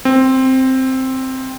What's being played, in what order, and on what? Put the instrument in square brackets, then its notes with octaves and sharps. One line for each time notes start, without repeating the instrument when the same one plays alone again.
[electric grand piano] C4